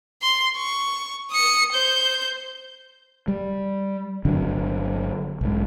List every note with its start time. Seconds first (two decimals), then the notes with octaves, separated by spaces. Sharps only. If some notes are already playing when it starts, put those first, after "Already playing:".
0.22 C6
0.56 C#6
1.31 D#6 C#7
1.73 C5 G6
3.28 G3
4.25 G1 D3 F#3 D4
5.41 B1 G#2